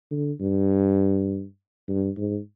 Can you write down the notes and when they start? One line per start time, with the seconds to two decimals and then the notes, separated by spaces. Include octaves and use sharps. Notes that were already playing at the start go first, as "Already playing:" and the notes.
0.11 D3
0.41 G2
1.88 G2
2.18 G#2